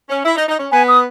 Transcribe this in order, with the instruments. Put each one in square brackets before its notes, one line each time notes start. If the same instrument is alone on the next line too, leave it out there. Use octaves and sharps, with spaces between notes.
[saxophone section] C#4
E4
D#4
D#4
C#4
[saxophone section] B3 [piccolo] G#5
[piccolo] D#6